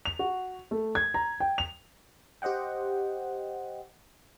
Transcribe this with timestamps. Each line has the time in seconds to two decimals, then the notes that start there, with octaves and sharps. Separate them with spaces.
0.05 F7
0.19 F#4
0.71 A3
0.95 G#6
1.14 A#5
1.40 G5
1.58 F7
2.42 G4 C5 D#5 F#5 G5